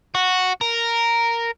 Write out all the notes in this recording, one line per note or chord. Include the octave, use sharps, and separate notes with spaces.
F#4
A#4